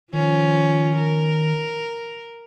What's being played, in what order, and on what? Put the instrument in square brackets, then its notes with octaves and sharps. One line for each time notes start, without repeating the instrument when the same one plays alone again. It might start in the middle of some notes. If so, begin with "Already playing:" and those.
[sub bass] D#3 [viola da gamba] F3 C#4 F4
[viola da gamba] A#4